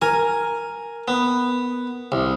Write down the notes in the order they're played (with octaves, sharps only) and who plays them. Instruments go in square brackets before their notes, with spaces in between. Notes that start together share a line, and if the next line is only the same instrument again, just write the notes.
[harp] A#4 [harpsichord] G#5
[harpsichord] B3
C2